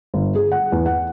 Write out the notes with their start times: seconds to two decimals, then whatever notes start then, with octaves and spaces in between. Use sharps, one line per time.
0.14 G1
0.35 G#4
0.52 F#5
0.72 E2
0.86 F#5